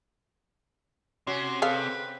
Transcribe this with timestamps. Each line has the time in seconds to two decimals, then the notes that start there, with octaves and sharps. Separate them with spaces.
1.27 C3 C#4 F#4 C6
1.62 C4 G#4 A4 B4 F5